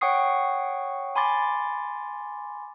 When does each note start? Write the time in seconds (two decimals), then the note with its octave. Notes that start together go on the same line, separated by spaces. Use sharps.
0.01 C#5 F#5 G5 C#6 D#6 C7
1.16 G#5 B5 C6 D6 A6